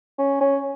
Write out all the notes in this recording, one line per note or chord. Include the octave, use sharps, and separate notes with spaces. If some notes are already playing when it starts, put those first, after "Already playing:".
C#4
C#4